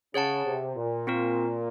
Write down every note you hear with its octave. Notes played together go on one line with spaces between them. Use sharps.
C#3 G#4 C#5 F#5 A5
C3
A#2
C4 F4 A#4